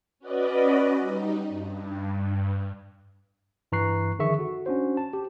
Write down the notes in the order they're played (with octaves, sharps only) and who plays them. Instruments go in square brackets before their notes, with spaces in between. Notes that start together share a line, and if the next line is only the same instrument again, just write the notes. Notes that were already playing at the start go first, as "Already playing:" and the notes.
[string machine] C#4 F#4 B4 D5 D#5
G3 D#4
G2
[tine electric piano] G2 E3 A#5 C#6 F#6 C7
D3 D#3 F3 G#4 E5 C#6
F#4 A4
C#4 D4 F#4 C5
A5
G4